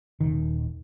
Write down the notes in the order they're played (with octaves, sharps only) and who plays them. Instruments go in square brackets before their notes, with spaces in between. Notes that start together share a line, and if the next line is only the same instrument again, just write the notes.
[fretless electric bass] D#1 D#3